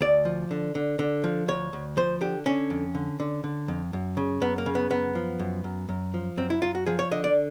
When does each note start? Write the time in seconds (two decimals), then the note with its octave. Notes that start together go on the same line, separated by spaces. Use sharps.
0.01 D2 D5
0.25 F3
0.51 D3
0.75 D3
0.99 D3
1.24 F3
1.48 D2 C#5
1.73 D2
1.97 F3 C5
2.21 D3 G4
2.46 D3 C#4
2.70 F2
2.95 D3
3.20 D3
3.44 D3
3.68 F2
3.93 F#2
4.17 C#3
4.41 F#2 B3
4.58 A#3
4.66 C#3
4.75 B3
4.91 F#2 B3
5.15 F3
5.39 F#2
5.64 F#2
5.89 F#2
6.14 F3
6.37 F#2 C4
6.50 E4
6.62 F#2 F4
6.75 F#4
6.86 F3 G#4
6.99 C#5
7.11 D3 D#5
7.24 D5